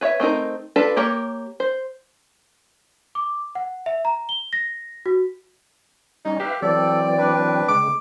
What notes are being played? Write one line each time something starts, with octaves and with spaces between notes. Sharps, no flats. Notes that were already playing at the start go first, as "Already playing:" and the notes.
B4 C#5 D5 E5
A3 C4 D#4 A#4
D4 F4 A4 B4 A5
A#3 G4 A#4 C#5
C5
D6
F#5
E5
A#5
G7
A#6
F#4
G3 C#4 D#4
G4 B4 E5 F5
E3 F#3 C4 A4 D5
G5
D4 B4
C#3 G#3 D6